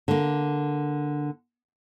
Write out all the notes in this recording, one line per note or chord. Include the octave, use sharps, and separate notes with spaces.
D3 A#3